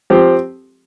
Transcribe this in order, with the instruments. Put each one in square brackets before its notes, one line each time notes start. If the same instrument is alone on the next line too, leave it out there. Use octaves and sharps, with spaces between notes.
[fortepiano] F3 C4 G4